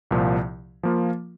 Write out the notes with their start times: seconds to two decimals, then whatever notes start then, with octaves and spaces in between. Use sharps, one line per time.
0.11 C2 A#2 F3
0.83 F3 A#3 F4